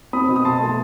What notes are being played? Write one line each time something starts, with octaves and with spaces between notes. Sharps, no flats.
C4 B5 D#6
B2
D#6
B2 A5 C6
A3
A5